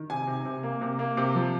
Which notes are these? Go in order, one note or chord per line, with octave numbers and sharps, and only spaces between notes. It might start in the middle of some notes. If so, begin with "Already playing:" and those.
Already playing: D#3
C3 G#5
C3
C3
A#3
C3
A#3
C3
F3